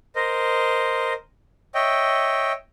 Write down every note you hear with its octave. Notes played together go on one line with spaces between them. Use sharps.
A#4 C5 D#5
C#5 D#5 E5 G5